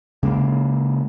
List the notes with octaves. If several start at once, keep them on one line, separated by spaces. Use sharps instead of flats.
C#3 G#3 A#3